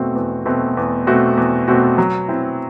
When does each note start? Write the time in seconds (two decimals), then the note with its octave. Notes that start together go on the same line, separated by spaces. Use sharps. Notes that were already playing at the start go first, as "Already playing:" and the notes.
Already playing: E2 B2 A3 C4 F#4
0.15 E2
0.45 B2 A3 C4 F#4
0.77 E2
1.07 B2 A3 C4 F#4
1.37 E2
1.68 B2 A3 C4 F#4
1.98 F#3
2.28 C4 E4